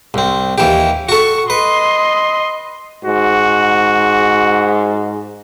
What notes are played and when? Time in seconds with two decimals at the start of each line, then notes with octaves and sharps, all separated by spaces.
0.14 C2 C4
0.58 D#2 E3 G4
1.09 F#4 A4 C#6
1.50 B4 D#5 C6
3.05 G#2 F#4